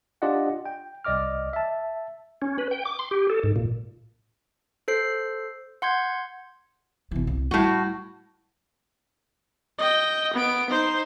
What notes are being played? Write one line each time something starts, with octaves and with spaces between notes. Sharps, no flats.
D4 F4 G4 D5 D#5 F#5
G5
C2 D5 D#5 D6 F6
E5 A5
C#4
B4
G5
D6
C6
G4
A4
G#2
A#2
A4 C5 C7
F#5 C6 G6 G#6
B2 E3
C2
A2 G3 E4 F#4
D#5 G5
B3 D7
D#4 C5